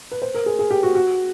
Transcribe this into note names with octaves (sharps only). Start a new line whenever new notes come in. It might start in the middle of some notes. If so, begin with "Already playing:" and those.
B4
C5
A#4
G#4
G#4
G4
F#4
F#4